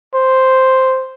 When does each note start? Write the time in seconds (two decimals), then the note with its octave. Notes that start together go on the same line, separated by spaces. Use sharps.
0.14 C5